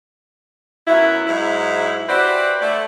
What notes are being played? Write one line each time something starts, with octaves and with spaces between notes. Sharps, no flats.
F#2 F#3 B3 E4
G#2 F#3 G#3 E4
E4 F#4 G4 B4 C5 D5
A3 E4 D5